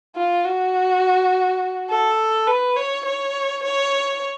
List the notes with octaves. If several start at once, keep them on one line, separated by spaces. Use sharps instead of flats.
F4
F#4
A4
B4
C#5
C#5
C#5